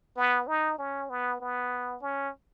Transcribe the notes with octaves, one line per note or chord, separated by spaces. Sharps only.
B3
D#4
C#4
B3
B3
C#4